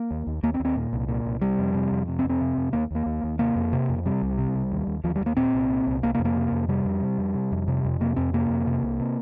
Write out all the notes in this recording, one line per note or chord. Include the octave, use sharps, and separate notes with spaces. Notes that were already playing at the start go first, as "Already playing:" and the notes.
Already playing: A#3
D#2
D#2
D#2 A#3
C4
D#2
C4
A#2
C2
A#2
C2
C3 G3
F2
C3
F2
C3
C4
F2
C4
C3
F2
D#2 A#3
D#2 A#3
D#2
D#2
C3 A#3
F2
C3
F2
C3 G3
C2
C3
C2
D#2
D#2
D#2 F3
D#2 G3
A#3
A#2 C4
C2
A#2
C2
C3 A#3
A#3
F2
A#3
C3
F2
C3 G3
F2
C3
F2
C3
F2
C3
F2
C3 A#3
F2 C4
C3 A#3
F2
C3
C2
C3